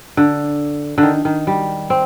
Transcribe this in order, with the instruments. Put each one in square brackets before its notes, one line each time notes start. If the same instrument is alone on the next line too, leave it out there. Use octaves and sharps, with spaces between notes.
[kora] D3
D3
D#3
D#3
G3
C4